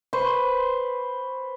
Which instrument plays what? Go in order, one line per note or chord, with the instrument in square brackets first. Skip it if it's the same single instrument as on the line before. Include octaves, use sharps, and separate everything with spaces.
[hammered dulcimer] B4 C5 C#6